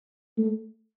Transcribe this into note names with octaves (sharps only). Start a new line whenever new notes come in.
A3